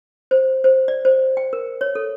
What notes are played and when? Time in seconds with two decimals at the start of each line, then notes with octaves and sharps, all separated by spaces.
0.31 C5
0.64 C5
0.88 D5
1.05 C5
1.37 G5
1.53 A#4
1.81 C#5
1.95 A4